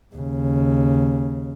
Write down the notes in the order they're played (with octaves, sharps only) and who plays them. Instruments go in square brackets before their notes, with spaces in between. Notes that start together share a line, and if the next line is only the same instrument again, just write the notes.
[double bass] D#2 C#3